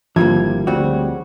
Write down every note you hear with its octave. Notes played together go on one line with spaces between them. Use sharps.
G#1 D3 F3 G3 A#3 E4 G#6
D2 C#3 G3 C4 F#4